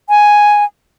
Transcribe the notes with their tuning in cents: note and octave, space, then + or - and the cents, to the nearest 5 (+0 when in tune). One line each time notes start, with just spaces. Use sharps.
G#5 +0